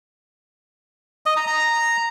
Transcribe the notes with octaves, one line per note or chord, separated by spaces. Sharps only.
D#5
A#5
A#5